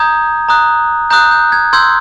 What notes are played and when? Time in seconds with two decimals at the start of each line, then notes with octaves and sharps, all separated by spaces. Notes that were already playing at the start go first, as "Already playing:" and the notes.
Already playing: A#5 D#6 G6 G#6
0.49 A#5 D#6 F#6
1.11 A#5 D#6 F#6 G6
1.31 G6
1.52 G#6
1.73 C6 E6 G6 G#6